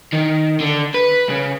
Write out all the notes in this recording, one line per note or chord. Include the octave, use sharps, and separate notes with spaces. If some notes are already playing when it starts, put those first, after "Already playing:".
D#3
D3
B4
C#3